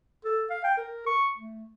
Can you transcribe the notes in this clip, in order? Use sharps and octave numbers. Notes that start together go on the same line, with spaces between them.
A4
F5
G5
A#4
C#6
A3